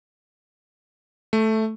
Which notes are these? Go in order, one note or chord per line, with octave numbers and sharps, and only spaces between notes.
A3